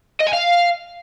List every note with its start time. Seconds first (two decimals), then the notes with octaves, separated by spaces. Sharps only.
0.20 D#5
0.27 G#5
0.33 F5